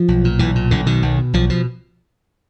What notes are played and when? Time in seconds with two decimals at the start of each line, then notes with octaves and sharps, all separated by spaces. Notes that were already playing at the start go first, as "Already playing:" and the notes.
Already playing: F3
0.08 B1
0.25 A#2
0.39 B1 E3
0.55 A#2
0.71 B1 D3
0.86 B2 D#3
1.03 B1
1.18 B2
1.33 B1 F3
1.50 B2 F3